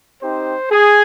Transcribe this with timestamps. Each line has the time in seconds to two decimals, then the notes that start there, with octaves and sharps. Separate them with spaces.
0.20 C4 D#4 G4 C5
0.70 G#4